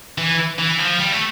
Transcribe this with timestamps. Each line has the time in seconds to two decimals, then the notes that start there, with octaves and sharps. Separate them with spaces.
0.18 E3
0.59 E3
0.78 F3
0.99 G3
1.12 A3